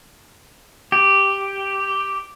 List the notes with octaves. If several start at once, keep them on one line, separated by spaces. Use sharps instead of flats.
G4